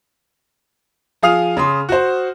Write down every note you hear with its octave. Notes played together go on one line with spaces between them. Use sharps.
F3 G#4 F5 D#6 F6 F7
C#3 C6
F#4 C5